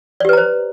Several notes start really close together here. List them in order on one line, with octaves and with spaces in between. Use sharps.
D5 G4 B4 A#5 C5